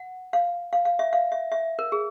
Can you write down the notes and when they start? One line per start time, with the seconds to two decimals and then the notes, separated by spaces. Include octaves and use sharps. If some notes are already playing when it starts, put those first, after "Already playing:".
Already playing: F#5
0.33 F5
0.73 F5
0.85 F5
0.99 E5
1.13 F5
1.32 E5
1.52 E5
1.79 A#4
1.92 G#4